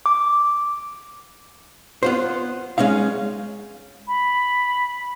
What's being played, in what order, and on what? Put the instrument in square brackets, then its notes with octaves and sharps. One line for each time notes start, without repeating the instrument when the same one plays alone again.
[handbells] D6
[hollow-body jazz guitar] B3 F4 C5
G#3 C#4 D#4 F5
[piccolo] B5